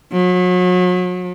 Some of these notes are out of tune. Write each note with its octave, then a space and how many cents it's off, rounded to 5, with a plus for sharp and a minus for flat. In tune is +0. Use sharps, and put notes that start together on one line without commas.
F#3 -35